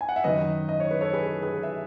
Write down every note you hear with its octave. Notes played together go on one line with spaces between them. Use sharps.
G#5
F#5
E5
F#2 D#3 F#3 B4 D#5
D#5
C#5
B4
A4 C#5
G#4 B4
G#4 B4
E5